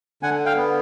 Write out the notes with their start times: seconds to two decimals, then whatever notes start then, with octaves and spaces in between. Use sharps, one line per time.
0.23 D3 F#5 G#5
0.46 F5 G5
0.56 B3